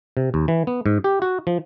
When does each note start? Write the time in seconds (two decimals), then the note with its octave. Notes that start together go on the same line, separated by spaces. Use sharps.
0.17 C3
0.34 D#2
0.48 E3
0.67 B3
0.86 G#2
1.04 G4
1.22 F#4
1.47 F3